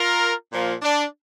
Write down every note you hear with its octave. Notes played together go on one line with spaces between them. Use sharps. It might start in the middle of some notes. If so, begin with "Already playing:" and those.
Already playing: F4 A#4
A#2 F3 A#3
D4